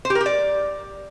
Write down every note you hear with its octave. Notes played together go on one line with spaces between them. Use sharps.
C5
G4
A#4
G4
D5